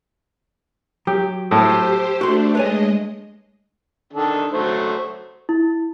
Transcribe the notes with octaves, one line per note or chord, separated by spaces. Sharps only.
F#3 G4
A2 G4 C5
A3 D4 F#4 C6
G#3 B4 C#5 D#5 G#5
D#3 D4 A4
F#3 A3 C5
E4